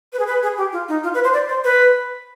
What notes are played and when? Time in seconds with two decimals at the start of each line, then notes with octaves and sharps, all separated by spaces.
0.13 B4
0.19 G#4
0.27 B4
0.43 G#4
0.58 G4
0.73 F4
0.89 D#4
1.03 F4
1.14 B4
1.24 C5
1.34 D5
1.49 C5
1.64 B4